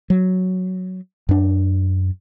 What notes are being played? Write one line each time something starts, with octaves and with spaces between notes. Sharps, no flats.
F#3
F#2 D4